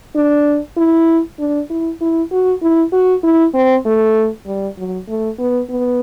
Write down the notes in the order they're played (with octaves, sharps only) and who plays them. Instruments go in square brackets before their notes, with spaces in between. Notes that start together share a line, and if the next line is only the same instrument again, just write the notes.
[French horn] D4
E4
D4
E4
E4
F#4
E4
F#4
E4
C4
A3
G3
F#3
A3
B3
B3